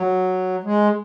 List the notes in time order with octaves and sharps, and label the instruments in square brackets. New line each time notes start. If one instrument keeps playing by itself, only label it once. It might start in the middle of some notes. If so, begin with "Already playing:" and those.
Already playing: [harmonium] F#3
G#3